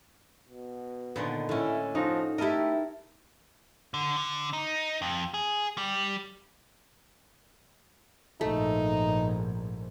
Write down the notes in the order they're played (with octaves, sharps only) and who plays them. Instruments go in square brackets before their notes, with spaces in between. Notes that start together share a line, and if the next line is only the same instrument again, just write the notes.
[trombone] B2
[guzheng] A#2 D3 D#3 [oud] B3
[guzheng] A2 C#4 [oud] D3 [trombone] E4
[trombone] F3 [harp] D#4 [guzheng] F#4
[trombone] A3 [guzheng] E4 A4 A#4 [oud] G4 D#5
[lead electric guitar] D3
D3
D#4
F2
G#4
G3
[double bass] A#1 G#2 [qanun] A3 [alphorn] D#4